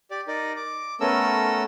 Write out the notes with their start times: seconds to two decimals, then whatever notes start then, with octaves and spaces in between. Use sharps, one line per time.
0.11 G4 D5
0.27 D#4 A#4 D5
0.56 D6
1.01 A3 B3 C#4 A4 A#4 E6